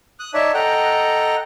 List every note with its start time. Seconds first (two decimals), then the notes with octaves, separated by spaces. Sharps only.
0.20 D#6 F#6
0.34 D#4 C#5 D5 E5 A5
0.54 A4 D#5 F#5 G5 A#5